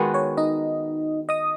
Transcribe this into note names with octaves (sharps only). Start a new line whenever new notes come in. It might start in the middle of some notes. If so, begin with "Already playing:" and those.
Already playing: D#3 G#3 B3 F#4
C#5
D#4 D#5
D#5 D#6